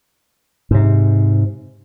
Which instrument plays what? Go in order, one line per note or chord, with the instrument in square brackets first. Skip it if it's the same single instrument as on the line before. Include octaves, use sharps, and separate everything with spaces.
[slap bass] G#2 C3